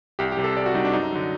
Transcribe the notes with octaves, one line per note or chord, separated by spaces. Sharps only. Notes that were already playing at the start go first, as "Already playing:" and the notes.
C2 G4
G4
C3 G3
A4
C2 D5
F#4
C3 G3 D#4
D4
F#2 D#4
D3 F#3